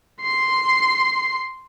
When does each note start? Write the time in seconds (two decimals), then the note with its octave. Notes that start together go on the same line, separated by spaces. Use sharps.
0.22 C6 C7